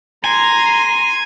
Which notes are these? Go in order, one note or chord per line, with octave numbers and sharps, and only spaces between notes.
G#5 A#5 C6